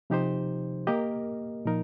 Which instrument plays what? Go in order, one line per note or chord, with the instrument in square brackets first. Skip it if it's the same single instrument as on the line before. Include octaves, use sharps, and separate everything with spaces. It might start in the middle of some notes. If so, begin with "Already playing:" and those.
[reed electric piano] C3 F3 D#4 G4 C5
A#3 G4 A#4 D#5
A#2 F3 D#4 A#4